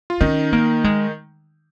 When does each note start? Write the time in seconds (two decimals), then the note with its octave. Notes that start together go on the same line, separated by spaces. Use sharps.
0.10 F4
0.21 D#3 C#4 D#4
0.52 A#3
0.84 G#3